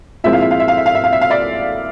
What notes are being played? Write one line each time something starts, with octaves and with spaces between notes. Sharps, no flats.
A#2 F3 G#3 C4 E4 E5
F5
E5
F5
E5
F5
E5
F5
E5
F5
E5
F5
D5 E5